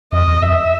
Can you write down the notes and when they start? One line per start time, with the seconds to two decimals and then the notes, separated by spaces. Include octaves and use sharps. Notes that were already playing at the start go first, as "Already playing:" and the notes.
0.12 F2 D#5
0.27 E2
0.42 F2 E5